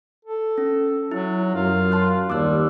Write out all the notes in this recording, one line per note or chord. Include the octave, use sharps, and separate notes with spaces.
A4
C#4
F#3 E4
F#2 F4
A5 C6 F#6
D#2 G3 D6 E6 F#6